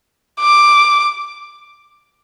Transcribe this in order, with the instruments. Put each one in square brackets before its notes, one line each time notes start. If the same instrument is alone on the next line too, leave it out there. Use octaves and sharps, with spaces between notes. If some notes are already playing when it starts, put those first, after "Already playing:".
[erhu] D6